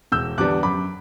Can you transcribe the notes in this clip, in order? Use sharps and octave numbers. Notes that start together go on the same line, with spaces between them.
E1 E6 G6
E2 D3 G3 B3 D6 F#6
F#2 B5 D6